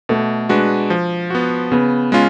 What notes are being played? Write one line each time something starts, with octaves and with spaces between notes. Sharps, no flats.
B2 A3
G#3 D4 F#4 B4
F3
B3 F#4
C#3 B3
G#3 C#4 F4